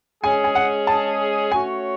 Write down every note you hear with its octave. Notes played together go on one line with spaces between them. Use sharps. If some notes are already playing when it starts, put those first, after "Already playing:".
G#3 C#4 G#4 G#5
G#5
F#5
A5
A3 C#4 F#4 C#5 G#5